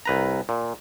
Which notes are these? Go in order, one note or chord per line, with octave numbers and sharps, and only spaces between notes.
C2 B4 A#5
A#2